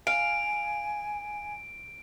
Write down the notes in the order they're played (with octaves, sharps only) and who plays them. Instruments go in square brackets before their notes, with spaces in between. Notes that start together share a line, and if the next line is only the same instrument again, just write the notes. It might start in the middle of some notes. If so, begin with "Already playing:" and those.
[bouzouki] F5 [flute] G#5 [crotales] D7